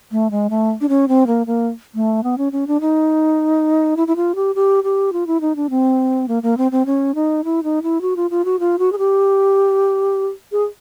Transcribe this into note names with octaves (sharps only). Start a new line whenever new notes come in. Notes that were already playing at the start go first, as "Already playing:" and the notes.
A3
G#3
A3
D4
C#4
C4
A#3
A#3
A3
B3
C#4
C#4
D4
D#4
E4
E4
F4
G4
G4
G4
F4
E4
D#4
D4
C4
A#3
A#3
C4
C4
C#4
D#4
E4
D#4
E4
F#4
F4
F4
F#4
F4
F#4
G#4
G4
G#4